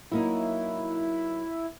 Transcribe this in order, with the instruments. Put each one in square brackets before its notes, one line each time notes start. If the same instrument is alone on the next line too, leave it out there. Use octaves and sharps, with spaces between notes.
[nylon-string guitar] F#3 A#3 D#4 [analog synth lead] E4